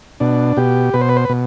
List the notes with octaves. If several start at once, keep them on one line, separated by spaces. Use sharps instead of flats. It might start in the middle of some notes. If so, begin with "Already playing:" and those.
B2 D4
B2 G4
B2 B4
C5
B4
C5
B4
B2